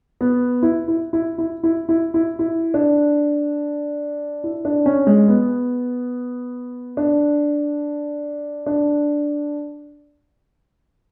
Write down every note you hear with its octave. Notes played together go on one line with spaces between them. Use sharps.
B3
E4
E4
E4
E4
E4
E4
E4
E4
D4
E4
D4
C#4
G#3
B3
D4
D4